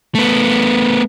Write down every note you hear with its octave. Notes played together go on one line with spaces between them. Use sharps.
A3 B3